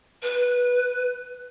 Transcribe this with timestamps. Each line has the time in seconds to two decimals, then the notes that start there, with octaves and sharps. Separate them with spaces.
0.23 B4